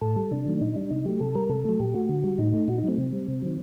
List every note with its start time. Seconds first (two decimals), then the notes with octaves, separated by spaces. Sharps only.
0.01 A2 A4
0.16 G3
0.31 C3 D4
0.46 D#3 F#3 A3
0.61 A#2 D#4
0.76 G3 D4
0.90 C3 D#4
1.05 F#3 A3 G4
1.20 C3 A4
1.35 G3 A#4
1.49 C3 A4
1.65 F#3 A3
1.80 A#2 G4
1.94 A3 F#4
2.09 D3
2.24 G3
2.38 A2 D#4
2.53 A3
2.68 A#2 F#4
2.78 D#4
2.84 F#3 A3 C4
2.98 C3
3.13 G3
3.28 C3
3.42 D#3 F#3